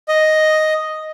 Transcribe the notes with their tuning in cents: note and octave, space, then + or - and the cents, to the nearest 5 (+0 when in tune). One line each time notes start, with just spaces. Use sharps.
D#5 +0